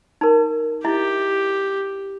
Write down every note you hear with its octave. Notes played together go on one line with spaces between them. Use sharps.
D#4 A#4
E4 G4 D#5 E5